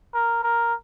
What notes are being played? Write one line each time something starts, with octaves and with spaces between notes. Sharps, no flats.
A#4
A#4